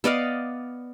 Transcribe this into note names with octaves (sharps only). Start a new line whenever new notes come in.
B3 D5 D#5 F5